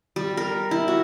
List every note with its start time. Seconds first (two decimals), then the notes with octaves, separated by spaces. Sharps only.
0.16 G3
0.37 A#4
0.71 E4
0.88 F#4